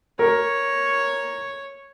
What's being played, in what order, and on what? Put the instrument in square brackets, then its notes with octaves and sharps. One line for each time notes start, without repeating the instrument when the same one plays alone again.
[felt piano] A#4 [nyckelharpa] C#5